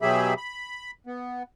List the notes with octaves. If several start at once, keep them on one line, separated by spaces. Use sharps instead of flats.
B2 F#3 G4 G#4 E5 B5
B5
B3